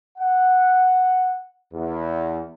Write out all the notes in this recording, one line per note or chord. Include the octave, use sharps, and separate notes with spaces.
F#5
E2